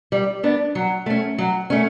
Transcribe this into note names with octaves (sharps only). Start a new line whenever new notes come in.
G3
B3 D4
F#3
A3 C#4
F#3
A3 C#4